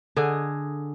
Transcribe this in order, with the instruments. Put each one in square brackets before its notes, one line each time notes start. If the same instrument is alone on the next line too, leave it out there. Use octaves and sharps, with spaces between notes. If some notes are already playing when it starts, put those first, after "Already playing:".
[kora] D3 G#4 D#5